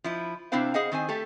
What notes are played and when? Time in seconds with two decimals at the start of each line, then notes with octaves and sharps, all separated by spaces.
0.04 F3 E4
0.52 C3 C4 D4 E4 C5 F5
0.74 G#4 C5 D#5 F5 F#5
0.92 D#3 C4 C5 G#5
1.09 A3 G4 A4